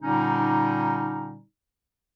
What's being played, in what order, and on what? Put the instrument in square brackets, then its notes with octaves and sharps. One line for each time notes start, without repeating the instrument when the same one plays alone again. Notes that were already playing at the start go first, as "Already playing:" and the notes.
[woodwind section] A#2 D3 G3 C#4 D#4